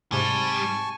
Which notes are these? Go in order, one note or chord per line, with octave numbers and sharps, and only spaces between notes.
G#2 C3 G3 G#5 A5 C#6